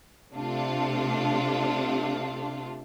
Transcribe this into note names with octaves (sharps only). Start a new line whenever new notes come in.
C3 A3 D4 F4